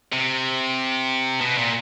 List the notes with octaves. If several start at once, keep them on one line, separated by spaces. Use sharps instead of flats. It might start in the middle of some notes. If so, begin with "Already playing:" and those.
C3
B2
A#2